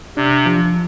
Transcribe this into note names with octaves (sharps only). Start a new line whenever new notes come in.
C3 D4
F3